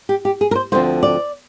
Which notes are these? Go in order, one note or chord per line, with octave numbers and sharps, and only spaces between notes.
G4
G4
G#4
A#4
C5
D2 D3 F3 C4 C5
D5